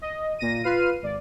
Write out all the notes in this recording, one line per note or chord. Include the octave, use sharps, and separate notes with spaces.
D#5
A#2 A#6 D#7
F4 B4 F5 F6 C7 D#7
G#1 D5